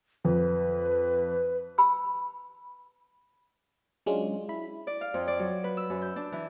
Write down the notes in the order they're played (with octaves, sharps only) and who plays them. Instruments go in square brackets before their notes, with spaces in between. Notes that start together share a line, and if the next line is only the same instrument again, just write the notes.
[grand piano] F2 [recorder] B4
[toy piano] B5 E6
[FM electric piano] F#3 G#3 C#4 D4 F4
E4 B5
[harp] D5
F5
F2
D5
F#3
B4
E6
F#2
G6
D4
E3